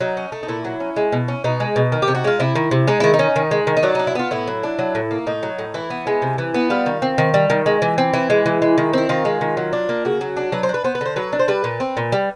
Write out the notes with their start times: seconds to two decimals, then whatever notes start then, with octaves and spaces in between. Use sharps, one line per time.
0.01 F#3 D#4
0.17 C#4
0.32 A3
0.43 D#4
0.48 A#2 E4
0.65 F#3
0.80 C#4
0.96 G#3
1.12 B2
1.28 C#4
1.44 B2 D#4
1.60 G#3
1.76 B2
1.92 D#3
2.02 G4
2.08 C3
2.15 F#4
2.24 G#3 F4
2.40 C3 E4
2.55 D#3
2.71 C3
2.87 G#3 D#4
3.00 D#3 E4
3.14 D#4
3.19 C#4
3.36 D#3
3.51 G#3
3.67 D#3
3.77 D#4
3.83 F#3 D4
3.95 D4 D#4
4.07 E4
4.15 B3 F4
4.31 A2 E4
4.47 F#3
4.63 D4
4.79 F#3
4.95 A2
5.11 A#3
5.27 A2 D#4
5.43 F#3
5.59 A2
5.74 E3 E4
5.90 B3
6.07 G#3
6.22 C3
6.38 E3
6.54 B3
6.70 G3 F4
6.86 D#3
7.02 C4
7.18 D#3
7.34 G3
7.50 D#3
7.66 G#3
7.82 E3
7.98 C4
8.13 E3 E4
8.30 G#3
8.46 E3
8.62 G#3
8.78 D#3
8.93 C4 E4
9.09 D#3 F4
9.25 G#3
9.41 D#3
9.57 F#3
9.73 D4
9.89 A#3
10.05 C#3 F#4
10.21 F#3
10.37 D4
10.52 F#3 B4
10.63 C5
10.69 D4
10.74 B4
10.84 B3 C5
10.95 B4
11.01 D3 C5
11.16 F#3 B4
11.33 D4
11.39 C5
11.48 G3 B4
11.64 A#2
11.80 C4
11.97 A#2
12.12 G3